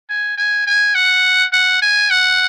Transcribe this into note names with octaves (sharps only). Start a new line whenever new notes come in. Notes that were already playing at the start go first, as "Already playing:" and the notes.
G#5
G#5
G#5
F#5
F#5
G#5
F#5